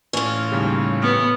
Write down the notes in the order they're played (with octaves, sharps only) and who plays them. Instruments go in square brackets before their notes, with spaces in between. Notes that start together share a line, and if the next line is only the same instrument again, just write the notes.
[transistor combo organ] A2 E3 [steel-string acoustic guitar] C#4 F4
[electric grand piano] D#2 C#3 G3
[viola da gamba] B3 [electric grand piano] F6